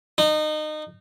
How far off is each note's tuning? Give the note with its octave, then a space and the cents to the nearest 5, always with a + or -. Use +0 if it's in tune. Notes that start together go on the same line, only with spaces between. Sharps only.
D#4 -25